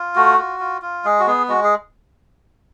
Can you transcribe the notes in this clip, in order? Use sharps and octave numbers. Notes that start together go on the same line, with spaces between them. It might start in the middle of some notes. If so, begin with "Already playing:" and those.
Already playing: F4
A3 F#4
F4
F4
F4
G#3 G#4
F#4
B3 G#4
G#3 F#4
G#4